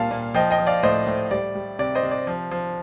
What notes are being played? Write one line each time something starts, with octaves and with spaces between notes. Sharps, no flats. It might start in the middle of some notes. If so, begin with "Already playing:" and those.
Already playing: A#2 G3 F5 A5
A#2
F3 D#5 G5
D#5 G5
F3
D5 F5
A2 C5 D#5
A2
G3 D5
G3
C3 D5
C5 D#5
C3
D5
F3
F3